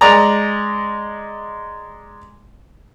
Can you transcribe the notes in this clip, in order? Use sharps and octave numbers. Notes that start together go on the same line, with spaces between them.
G#3 D5 A#5